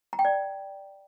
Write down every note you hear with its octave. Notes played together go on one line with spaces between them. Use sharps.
A#5
G5
D5